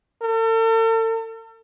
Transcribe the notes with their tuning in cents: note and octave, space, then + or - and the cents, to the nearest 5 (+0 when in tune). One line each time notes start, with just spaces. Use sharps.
A4 +45